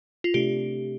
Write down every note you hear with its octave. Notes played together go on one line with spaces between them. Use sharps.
F4
C3 A3 D4 G4